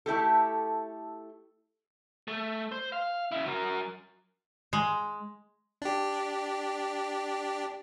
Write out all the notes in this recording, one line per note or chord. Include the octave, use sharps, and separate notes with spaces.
A3 E4 G4 A4
A3
C5
F5
C#3 E4
F#3 A#4
G#3
D4 G4